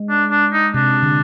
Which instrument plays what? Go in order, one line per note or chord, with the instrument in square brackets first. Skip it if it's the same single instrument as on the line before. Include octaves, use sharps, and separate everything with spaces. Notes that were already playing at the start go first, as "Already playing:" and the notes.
Already playing: [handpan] G#3
[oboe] D4
D4
D#4
[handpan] C3 [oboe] D4
[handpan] D3